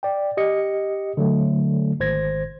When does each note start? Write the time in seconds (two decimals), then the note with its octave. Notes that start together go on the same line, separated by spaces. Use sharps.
0.03 D5 G5
0.37 G4 D#5 C#7
1.17 D3 F#3 A3
2.00 G#1 C5 G#6 A#6